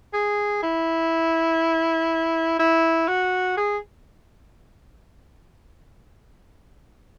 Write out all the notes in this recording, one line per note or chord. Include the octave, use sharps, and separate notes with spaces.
G#4
E4
E4
F#4
G#4